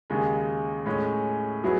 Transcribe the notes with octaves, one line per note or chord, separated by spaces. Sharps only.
D#2 C#3 G#3
A2 G#3 C#4
F#3 B3 E4 G#4